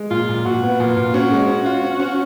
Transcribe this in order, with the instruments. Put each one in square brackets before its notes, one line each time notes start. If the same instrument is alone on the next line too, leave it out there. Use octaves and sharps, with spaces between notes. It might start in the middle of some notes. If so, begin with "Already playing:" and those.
Already playing: [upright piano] G#3
[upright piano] A#2 [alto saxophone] F4
[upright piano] A#2
[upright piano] A#2 [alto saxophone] F#4
[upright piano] B3
[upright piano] A#2 [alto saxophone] F4
[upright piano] A#2
[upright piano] C#4 [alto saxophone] F#4
[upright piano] G#3
C#4
F4
C#4
C#4